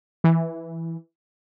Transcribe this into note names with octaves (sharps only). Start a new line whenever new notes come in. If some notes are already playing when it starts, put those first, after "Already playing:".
E3